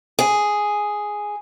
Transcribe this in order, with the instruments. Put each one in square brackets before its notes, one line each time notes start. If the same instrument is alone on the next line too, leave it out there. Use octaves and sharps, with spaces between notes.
[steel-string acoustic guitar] G#4